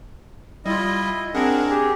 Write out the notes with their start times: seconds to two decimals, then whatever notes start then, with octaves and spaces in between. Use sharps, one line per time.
0.66 G3 E4 F4 D#5
1.35 C4 D4 G#4 A#4 F#5
1.70 G4 G#4